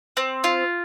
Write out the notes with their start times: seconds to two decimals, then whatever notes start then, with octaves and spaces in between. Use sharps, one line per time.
0.17 C4
0.44 F4